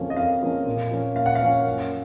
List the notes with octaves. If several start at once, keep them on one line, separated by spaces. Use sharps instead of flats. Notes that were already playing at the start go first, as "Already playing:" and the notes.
Already playing: F2 C#3 F3 A#3 C#4
D#5
F2 F5
C#3 F3 A#3 C#4
A#2
F3 A#3 C#4
A#2 F5
F#5
F5
F3 A#3 C#4
F#2